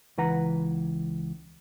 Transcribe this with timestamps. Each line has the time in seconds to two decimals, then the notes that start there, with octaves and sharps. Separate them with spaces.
0.18 C#2 E3 B4 F#5 A#5